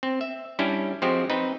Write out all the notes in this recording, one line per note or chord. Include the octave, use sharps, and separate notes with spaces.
C4
E5
G3 C#4 D4 E4 G4
F3 G#3 C4 F#4 G4
C4 D#4 B4